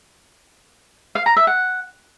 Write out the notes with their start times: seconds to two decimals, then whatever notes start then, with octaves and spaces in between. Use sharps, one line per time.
1.15 F5
1.26 A#5
1.36 E5
1.47 F#5